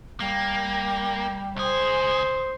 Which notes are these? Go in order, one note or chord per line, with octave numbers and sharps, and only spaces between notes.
G3 A#3
C#2 G#4 C5